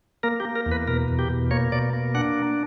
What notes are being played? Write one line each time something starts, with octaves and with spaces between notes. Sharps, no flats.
A#3 A#4
G4
A#3
A#4
E2
B4
B2 A#4
E2
G4
B2
A#3 C#5
B2 D5
A#3
D4 F#5